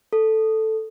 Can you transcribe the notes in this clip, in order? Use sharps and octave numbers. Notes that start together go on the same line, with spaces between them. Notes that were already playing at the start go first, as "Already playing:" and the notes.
A4